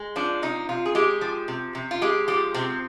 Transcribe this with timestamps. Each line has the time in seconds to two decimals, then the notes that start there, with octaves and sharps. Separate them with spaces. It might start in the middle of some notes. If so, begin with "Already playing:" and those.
Already playing: G#3
0.16 F3 D4
0.42 C3 D#4
0.69 C3 F4
0.86 G#4
0.95 G#3 G4
1.21 F3
1.48 C3
1.75 C3
1.91 F4
2.02 G#3 G4
2.28 F3 G4
2.54 C3 C4